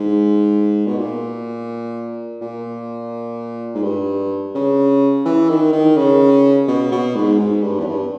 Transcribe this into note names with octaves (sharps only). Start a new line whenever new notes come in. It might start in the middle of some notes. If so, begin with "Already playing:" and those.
Already playing: G#2
B2
A#2
A#2
G#2
G2
C#3
E3
D#3
D#3
C#3
B2
B2
G#2
G#2
G2
E2
G2